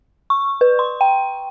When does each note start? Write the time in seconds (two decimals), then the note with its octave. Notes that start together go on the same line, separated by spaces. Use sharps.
0.30 C#6
0.61 B4
0.79 C6
1.01 G5